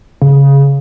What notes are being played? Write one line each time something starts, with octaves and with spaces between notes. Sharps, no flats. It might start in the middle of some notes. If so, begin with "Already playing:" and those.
C#3